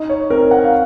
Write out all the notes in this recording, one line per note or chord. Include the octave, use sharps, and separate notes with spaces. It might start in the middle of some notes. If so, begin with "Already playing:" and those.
Already playing: D#4 D#5
C#5
C4 A#4
F#5
F5